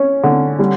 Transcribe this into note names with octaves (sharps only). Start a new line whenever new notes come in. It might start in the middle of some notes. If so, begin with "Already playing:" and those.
Already playing: C#4
D3
G3